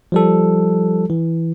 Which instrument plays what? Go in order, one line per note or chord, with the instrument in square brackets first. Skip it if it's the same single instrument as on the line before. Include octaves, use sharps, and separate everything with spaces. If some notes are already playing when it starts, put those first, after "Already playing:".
[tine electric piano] F3 G3 A4
E3